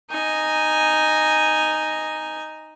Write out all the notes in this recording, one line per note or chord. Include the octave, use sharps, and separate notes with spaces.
D#4 G#5